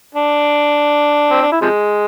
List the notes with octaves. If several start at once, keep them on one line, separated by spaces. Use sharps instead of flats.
D4
C4
D4
E4
C3 F3 G#3